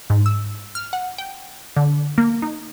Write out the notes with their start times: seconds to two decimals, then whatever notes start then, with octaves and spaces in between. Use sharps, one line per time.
0.10 G#2
0.26 E6
0.75 F6
0.93 F#5
1.18 G5
1.76 D3
2.18 A#3
2.42 D#4